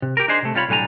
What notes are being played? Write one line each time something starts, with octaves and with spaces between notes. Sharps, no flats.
C3
G4 A#4
D4 D#4 G#4 C5
C3 A3
C3 G3 F4 C#5 B5
B1 A2 D3 G3 G#5 A#5